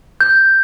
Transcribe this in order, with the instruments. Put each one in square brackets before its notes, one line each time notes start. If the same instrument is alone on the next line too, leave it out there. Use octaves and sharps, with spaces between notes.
[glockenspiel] G6